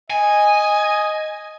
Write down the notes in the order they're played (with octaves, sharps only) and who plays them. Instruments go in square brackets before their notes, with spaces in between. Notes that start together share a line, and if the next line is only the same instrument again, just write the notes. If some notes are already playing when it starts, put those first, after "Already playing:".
[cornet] D#5 [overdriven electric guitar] G#5